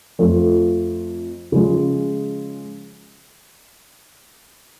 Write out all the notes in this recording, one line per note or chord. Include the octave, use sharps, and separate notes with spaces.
F2 F3 A3 F4
C#3 F3 G#3